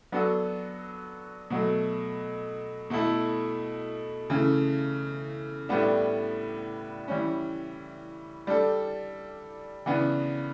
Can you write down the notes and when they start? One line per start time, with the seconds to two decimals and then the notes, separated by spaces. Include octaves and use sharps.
0.12 F#3 B3 D4 F#4 A4
1.50 B2 F#3 A3
2.90 B2 A3 E4 A4
4.30 C#3 E3 A3
5.69 A2 G3 B3 D4
7.08 E3 G3 C#4
8.47 G3 D4 A4
9.86 C#3 E3 B3 D4